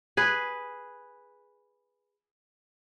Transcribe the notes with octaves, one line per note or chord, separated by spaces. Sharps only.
G#4 B4